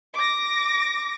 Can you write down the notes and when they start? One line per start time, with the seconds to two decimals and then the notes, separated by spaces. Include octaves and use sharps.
0.15 D6 A#6